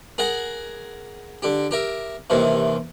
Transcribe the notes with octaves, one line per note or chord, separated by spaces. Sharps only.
G#4 A#4 F#5 G#5
D3 G4
G4 A#4 E5
D#2 C3 D#3 E3